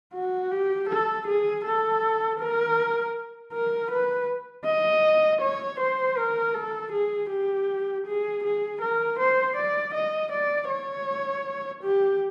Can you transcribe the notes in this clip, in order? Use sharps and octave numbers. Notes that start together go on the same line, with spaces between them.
F#4
G4
A4
G#4
A4
A#4
A#4
B4
D#5
C#5
C5
A#4
A4
G#4
G4
G#4
G#4
A#4
C5
D5
D#5
D5
C#5
G4